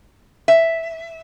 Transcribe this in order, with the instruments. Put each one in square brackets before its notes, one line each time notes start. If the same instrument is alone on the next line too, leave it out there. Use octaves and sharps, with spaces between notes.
[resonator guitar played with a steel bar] E5